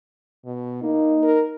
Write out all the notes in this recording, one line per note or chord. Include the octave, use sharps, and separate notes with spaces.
B2
A#3 D#4
A#4